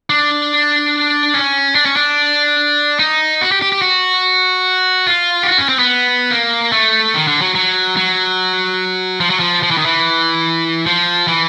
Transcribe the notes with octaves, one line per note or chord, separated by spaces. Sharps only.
D4
C#4
D4
C#4
D4
D#4
F#4
G4
G4
G4
F#4
F4
G4
F#4
C#4
C4
B3
A#3
A3
D#3
D3
F#3
F#3
F#3
F3
F#3
F3
F3
E3
D#3
E3
F3
E3